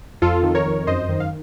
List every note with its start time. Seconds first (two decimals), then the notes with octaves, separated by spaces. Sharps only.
0.22 F2 F4 A4
0.43 D#3
0.55 A#4 C#5
0.66 F2
0.87 F#2 C5 D#5
1.09 D#3
1.20 F5